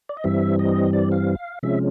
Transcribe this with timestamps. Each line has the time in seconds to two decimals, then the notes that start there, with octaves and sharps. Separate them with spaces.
0.09 D5
0.17 D#5
0.24 G2 E3 G3 C4 E5
0.59 D#5
0.93 D5
1.12 F5
1.63 C3 F3 G#3 C#4 E5